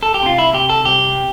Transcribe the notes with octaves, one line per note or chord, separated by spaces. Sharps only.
A4
G4
C3 F4
E4
C3 G4
A4
C2 G4